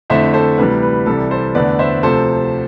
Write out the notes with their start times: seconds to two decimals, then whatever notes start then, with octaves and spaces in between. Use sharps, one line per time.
0.10 F2 D3 A3 E4 C5 E5
0.34 A4 C5
0.58 D2 C3 E3 G3 B4
0.83 B4
1.06 C2 C3 E3 G3 A4
1.30 A4 C5
1.54 E2 D3 A3 B4 D5
1.79 C5 E5
2.03 D2 C3 F3 A4 C5